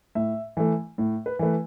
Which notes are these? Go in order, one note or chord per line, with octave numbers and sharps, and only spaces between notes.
A2 E5
E3 A3
A2
B4
E3 A3 B4